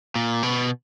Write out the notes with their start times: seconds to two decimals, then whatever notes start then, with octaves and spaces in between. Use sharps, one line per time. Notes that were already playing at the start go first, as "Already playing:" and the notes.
0.15 A#2
0.43 B2